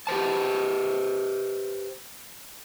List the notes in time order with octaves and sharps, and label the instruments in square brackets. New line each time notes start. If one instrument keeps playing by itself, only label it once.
[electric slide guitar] G4 B4 C5 A5